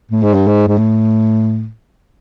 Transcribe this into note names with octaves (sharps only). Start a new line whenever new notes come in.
A2
G#2
G2
G#2
G#2
A2